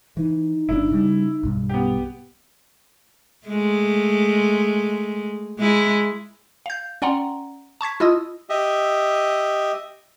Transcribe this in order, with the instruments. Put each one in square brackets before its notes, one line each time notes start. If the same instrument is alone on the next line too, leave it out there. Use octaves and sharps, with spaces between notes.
[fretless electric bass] E3 [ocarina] D#4
[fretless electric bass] G1 B2 D4 [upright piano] E4
[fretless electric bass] C#3 G3
B1 G2
[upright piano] B3 G4
[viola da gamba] G#3 A3
G#3 E4
[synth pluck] F5 G6
C#4 D5 F#5 G5 A#5 C6
A5 C#6 G#6 B6
E4 F4 D#5 D#6 E6
[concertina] G4 D#5 E5